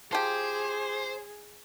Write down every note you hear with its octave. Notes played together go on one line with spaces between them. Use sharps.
F3 G4 G#4 C5